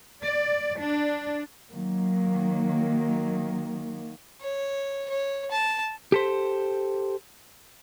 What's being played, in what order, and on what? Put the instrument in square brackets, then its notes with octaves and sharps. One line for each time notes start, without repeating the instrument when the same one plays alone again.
[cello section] D5
D4
D#3 F#3 A#3
[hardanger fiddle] C#5
C#5
A5
[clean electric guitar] G4 A4 C5